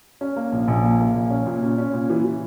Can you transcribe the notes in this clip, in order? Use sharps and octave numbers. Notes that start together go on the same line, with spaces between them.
C#4
A#3
A#1
A#1
A#3
A#3
A#1
C#4
A#2
C#4
C#4
A#2
E3
E3